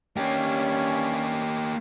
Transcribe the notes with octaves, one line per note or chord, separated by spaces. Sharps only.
G2 A#3 C#4 G4